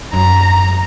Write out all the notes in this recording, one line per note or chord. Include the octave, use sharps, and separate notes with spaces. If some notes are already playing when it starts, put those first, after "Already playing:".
F#2 A#5